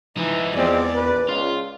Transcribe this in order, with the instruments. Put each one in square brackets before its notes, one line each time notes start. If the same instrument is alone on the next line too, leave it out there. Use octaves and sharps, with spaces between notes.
[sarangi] E3 [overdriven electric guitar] F3 D#4
[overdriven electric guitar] E2 [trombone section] F3 G#3 C4 [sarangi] D5
[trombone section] A#1 B4
[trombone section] C#2 [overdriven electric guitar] F4